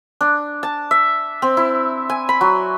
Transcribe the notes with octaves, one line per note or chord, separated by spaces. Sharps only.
D4
A5
E5
C4
E4
G#5
B5
F#3